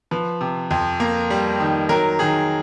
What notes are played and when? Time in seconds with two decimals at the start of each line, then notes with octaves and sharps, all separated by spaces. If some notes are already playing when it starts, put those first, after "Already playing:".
0.11 F3 B4
0.41 C3
0.71 F2
1.00 A#3
1.30 G3
1.60 D#3
1.89 F#3 A#4
2.19 D#3 G#4